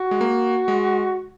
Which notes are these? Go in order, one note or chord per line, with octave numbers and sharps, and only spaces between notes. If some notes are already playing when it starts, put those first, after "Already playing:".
Already playing: F#4
G#3
A#3
G#3